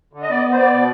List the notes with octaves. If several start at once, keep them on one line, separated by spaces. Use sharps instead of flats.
D3
D#5
B3 D5
D#5
B3
C5
B3 D5
B2